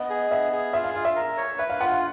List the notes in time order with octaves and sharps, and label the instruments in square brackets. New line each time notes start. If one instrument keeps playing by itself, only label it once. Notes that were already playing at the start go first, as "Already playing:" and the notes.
Already playing: [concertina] B3 [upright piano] D#5
[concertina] G#4
[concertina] B3 [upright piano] E5
[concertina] G#4
[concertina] F4 [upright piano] E5
[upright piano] F5
[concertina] F4 [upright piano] F5
[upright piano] E5
[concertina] A#4
C#5
[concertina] B4 [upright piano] E5
[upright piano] F5
[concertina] F4 [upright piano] F#5
[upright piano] F5